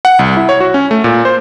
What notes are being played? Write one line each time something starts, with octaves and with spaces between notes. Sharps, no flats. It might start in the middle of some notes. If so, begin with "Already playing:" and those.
F#5
C2
E4
C#5
F#4
C#4
A3
A#2
C5